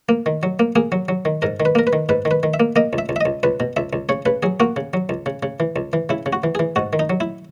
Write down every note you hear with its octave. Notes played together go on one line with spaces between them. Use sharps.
A#3
D#3
F#3
A#3
A#3 G#4
F#3
F#3
D#3
G#2 A#4
D#3
B4
A#3 A#4
B4
D#3
G#2 B4
D#3
B4
D#3
E5
A#3
A#3 D#5
C#2
E5
C#2
E5
C#2 D#5
C#2 B4
B2
C#2 E5
C#2
C#3 C#5
C#3 B4
F#3 G#4
A#3 F#4
C#3
F#3
C#2
C#3
C#3
E3
C#2
E3
C#3 E4
C#3
F#4
E3
E3 G#4
G#2 F#4
D#3
D#4
F#3
E4